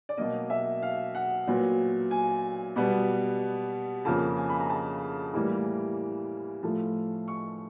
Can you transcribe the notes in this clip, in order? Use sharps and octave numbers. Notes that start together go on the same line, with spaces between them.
D5
B2 F#3 A#3 D#5
E5
F5
F#5
A#2 F#3 B3
G#5
B2 G3 B3
F2 C#3 F3 A#3 A5
G#5
B5
A#5
A5
A2 E3 G3 A#3
A2 F3 A3 A5
C#6